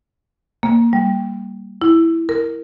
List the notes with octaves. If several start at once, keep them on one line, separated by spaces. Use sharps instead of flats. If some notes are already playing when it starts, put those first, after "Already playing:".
A#3
G3
E4
A#4